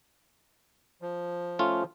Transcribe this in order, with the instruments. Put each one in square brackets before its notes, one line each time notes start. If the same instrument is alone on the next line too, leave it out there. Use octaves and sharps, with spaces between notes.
[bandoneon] F3
[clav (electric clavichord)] A3 C#4 F4